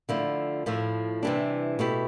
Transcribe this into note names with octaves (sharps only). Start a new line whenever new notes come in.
D3 F3 A3 E4
A2 F3 A3 E4
C3 E3 G3 D4
B2 A3 E4 G4